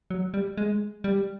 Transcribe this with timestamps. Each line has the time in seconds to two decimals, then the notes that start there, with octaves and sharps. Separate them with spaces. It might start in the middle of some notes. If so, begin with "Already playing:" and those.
0.10 F#3
0.34 G3
0.57 G#3
1.04 G3